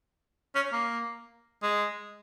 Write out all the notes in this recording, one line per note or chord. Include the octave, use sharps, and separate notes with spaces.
C#4
A#3
G#3